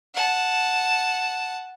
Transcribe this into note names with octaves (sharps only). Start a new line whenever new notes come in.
F#5 A5